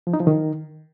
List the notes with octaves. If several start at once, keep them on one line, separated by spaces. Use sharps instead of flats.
F3
D#4
F3
D#3